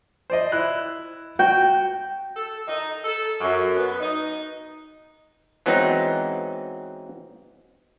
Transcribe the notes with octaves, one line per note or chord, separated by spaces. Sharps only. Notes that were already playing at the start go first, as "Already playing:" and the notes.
C5 D5 D#5
E4 F#6
F#4 G5
A4
D#4
A4
F#2
B3
D#4
E3 F#3 G#3 B3 C4 D#4